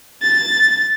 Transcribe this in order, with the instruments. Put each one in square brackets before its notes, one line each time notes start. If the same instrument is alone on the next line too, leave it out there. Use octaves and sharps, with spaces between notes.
[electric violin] A6